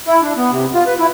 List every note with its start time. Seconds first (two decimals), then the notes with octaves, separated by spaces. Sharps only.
0.07 E4
0.22 D4
0.37 B3
0.51 C3
0.74 F4
0.87 B4
0.98 E4